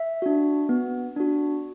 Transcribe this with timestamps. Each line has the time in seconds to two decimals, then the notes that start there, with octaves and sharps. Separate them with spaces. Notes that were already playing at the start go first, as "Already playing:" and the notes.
Already playing: E5
0.22 D4 F#4
0.69 B3
1.16 D4 F#4